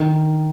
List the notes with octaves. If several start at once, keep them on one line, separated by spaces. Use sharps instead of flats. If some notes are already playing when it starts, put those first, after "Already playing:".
Already playing: D#3